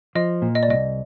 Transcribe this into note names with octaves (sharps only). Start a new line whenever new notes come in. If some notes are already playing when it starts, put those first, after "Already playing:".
F3 D#5
A#2
D#5
D5
C2 D#5